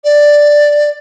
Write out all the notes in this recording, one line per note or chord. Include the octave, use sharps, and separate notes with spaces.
D5